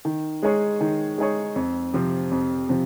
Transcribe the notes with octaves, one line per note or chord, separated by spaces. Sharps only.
D#3
G#3 D#4 G#4 C#5
D#3
G#3 D#4 G#4 C#5
F2
C3 F3 C4
F2
C3 F3